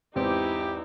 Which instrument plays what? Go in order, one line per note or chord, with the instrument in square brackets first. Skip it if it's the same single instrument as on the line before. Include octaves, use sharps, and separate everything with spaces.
[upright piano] E2 G#2 C4 [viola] D#4 E4 [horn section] G4